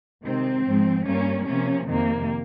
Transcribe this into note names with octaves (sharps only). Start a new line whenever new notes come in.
C3 D#3 G#3 C4
G#2 F3 G#3
G2 G3 A#3 C#4
C3 F3 A#3 C#4
F2 C3 D#3 A#3